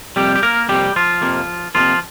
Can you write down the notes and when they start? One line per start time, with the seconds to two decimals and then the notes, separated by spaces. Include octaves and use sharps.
0.16 F2 C3 G3 A#3 G4
0.35 G4
0.43 A#3 A#4
0.68 F2 C3 G3 A#3 G4
0.96 F3 F4
1.21 F2 C3 A#3
1.74 F2 C3 F3 A#3 F4